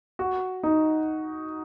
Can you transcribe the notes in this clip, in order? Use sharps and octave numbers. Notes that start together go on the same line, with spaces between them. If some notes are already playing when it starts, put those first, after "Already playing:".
F#4
D#4